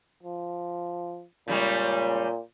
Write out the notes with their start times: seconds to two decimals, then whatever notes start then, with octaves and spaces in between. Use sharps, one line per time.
0.23 F3
1.48 A#2 C#3 G3 G#3